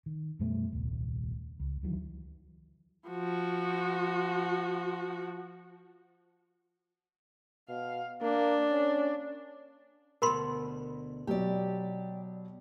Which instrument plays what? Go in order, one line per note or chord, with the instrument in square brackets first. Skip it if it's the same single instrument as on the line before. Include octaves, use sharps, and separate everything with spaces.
[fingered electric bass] D#3
F#2 B2 G3 A3
D#1 C2
C#2
D2 D#3 E3 F#3
[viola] F3 F#4
[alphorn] B2 [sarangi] F5
[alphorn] A#3 [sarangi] D4
[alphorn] C#4
[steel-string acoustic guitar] D2 B2 [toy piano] A#4 B5 C6
[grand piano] B2 F#3 [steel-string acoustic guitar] G4 D5